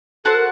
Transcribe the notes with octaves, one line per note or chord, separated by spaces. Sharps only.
F#4 A4 C5 F#5 A5
A#4